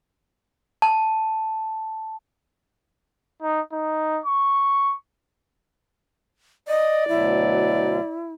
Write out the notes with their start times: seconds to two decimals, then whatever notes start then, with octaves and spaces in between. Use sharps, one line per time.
0.82 A5
3.42 D#4
3.72 D#4
4.26 C#6
6.68 D5 D#5
7.08 D2 B2 F#3 E4